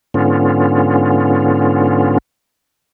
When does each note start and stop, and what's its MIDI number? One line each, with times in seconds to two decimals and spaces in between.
0.14 2.18 44
0.14 2.18 50
0.14 2.18 59
0.14 2.18 61
0.14 2.18 65